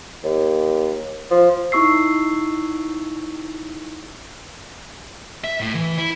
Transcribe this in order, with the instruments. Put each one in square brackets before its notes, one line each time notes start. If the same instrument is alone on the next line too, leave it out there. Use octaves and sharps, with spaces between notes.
[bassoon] D#2
F3
[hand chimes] D#4 E4 C#6 E6 C7
[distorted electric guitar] E5
A2
E3
E4